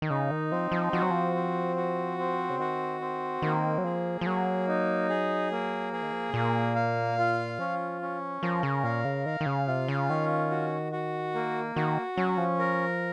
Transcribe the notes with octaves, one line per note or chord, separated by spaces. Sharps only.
D#3
C#3 D#4
D#3
F3 C4
F3
F3 F#4
F#3
F3
C4
F#4
C4
C#3
D#3 F#4
C4
D#3 A#3
F#3
F3 G#4
F3
F#3 A#3
D#4
G#4
A#3
F3 G#4
D#3
F3
C3
A#2 A#3
F5
F4
F3 C#4
C#4
F3 A#4
C#3
A#2 F5
C#3
D#3 F5
D#3
C#3
C3 F4
C#3
D#3 C#4
F#4
F#4
A#3
D#3 F#4
F#3 C#4
F3
A#4